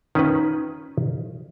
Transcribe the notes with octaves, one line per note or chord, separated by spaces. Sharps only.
D#3 C#4 F4 B4